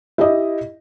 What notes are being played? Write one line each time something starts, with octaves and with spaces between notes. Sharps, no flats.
E4 G4 D#5